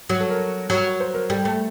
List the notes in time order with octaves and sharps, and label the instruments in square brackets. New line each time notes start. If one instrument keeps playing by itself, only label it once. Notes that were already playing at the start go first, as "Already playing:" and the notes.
[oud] F#3 [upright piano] F#4
[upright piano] A4
A#4
[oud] F#3
[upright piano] C5
A#4
[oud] G3 [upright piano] A4
[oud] A3